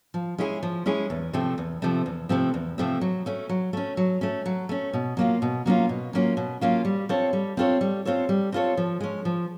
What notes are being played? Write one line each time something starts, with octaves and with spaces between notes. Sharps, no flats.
F3
G#3 C#4 E4 G#4
F3
G#3 C#4 E4 G#4
E2
C3 F3 A3 C4
E2
C3 F3 A3 C4
E2
C3 F3 A3 C4
E2
C3 F3 A3 C4
F#3
A3 C#4
F#3
A3 C#4
F#3
A3 C#4
F#3
A3 C#4
B2
F#3 A#3 C#4 F4
B2
F#3 A#3 C#4 F4
B2
F#3 A#3 C#4 F4
B2
F#3 A#3 C#4 F4
G3
C4 F4 A4 C#5
G3
C4 F4 A4 C#5
G3
C4 F4 A4 C#5
G3
C4 F4 A4 C#5
F3
G#3 C#4
F3